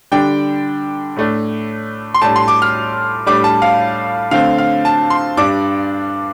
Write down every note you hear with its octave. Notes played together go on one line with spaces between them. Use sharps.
D3 G3 D4 G5
A2 A3 D4
C6
A2 G3 D4 A5
C6
D6
F6
A2 G3 D4 D6
A5
F5
D3 A3 C4 F5
F5
A5
C6
G2 G3 D4 D6